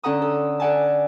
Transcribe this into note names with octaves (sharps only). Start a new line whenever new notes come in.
D3 C#4 A4 F#5 A#5 D#6
A4
A4 D5 F#5 G#5 A5